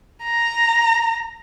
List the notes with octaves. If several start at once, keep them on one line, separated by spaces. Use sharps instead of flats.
A#5